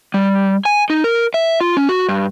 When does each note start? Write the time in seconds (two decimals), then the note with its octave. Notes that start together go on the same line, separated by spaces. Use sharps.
0.14 G3
0.65 G#5
0.90 D#4
1.04 A#4
1.34 E5
1.61 F4
1.77 C#4
1.89 F#4
2.09 G2